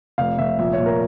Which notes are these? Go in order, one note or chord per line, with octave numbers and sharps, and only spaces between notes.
F1 F5
F1 E5
A#1 E5
C#5
A#2
A#4